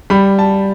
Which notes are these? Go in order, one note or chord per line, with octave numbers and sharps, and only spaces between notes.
G3 B5
A5